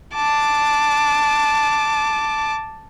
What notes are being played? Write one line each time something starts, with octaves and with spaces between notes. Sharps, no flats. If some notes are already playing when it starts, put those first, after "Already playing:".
A5 D6